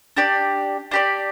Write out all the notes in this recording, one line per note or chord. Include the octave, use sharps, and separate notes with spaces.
D4 G4 D5
D4 G4 D5